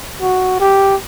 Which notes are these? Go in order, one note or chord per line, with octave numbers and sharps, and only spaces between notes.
F#4
G4